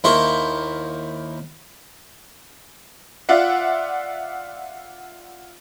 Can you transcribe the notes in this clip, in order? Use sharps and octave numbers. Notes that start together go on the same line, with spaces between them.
D#2 A#3 E4 C5 C#6
F4 D5 E5 F#5